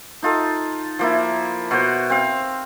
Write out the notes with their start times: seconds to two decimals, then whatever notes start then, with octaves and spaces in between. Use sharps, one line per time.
0.23 D#4 F4 A4
0.99 F3 A#3 E4
1.71 B2 F#4 C5
2.10 C4 F5